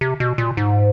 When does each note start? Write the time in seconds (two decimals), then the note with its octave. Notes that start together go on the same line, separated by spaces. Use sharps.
0.01 C3
0.20 B2
0.38 A#2
0.57 G#2